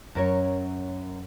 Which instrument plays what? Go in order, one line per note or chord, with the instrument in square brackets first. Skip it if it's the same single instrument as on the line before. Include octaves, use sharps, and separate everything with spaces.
[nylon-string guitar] F#2 A#4 C#5